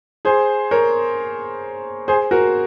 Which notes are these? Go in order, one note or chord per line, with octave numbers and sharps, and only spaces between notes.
G#4 C5
A#4 C#5
G#4 C5
F#4 A#4